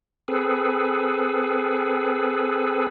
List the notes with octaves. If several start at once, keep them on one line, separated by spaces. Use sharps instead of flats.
C4 G#4 A4 B4